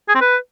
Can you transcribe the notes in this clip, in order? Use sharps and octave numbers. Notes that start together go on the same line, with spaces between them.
G#4
C4
B4